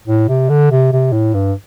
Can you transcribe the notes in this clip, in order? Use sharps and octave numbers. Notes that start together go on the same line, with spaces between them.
A2
C3
D3
C3
C3
A2
G2